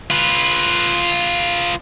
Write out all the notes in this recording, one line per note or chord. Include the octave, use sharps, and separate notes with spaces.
F4 B4